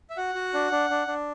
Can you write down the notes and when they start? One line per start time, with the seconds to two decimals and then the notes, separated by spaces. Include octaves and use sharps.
0.10 E5
0.17 F#4 F#5
0.35 F#4
0.54 D4
0.71 D4
0.90 D4
1.07 D4